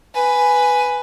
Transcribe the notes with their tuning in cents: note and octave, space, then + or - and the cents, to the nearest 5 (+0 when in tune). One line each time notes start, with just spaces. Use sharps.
B4 +5 G#5 +0